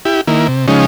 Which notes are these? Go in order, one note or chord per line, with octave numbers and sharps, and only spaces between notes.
E4 G4
D#3 A#3 E4
C3
C#3 F3 G#3 C#4 D#4